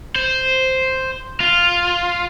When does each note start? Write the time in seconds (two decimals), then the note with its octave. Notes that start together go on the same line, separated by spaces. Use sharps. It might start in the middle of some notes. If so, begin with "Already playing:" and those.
0.16 C5
1.40 F4